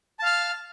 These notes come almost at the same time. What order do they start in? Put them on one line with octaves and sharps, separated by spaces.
A5 F5 F6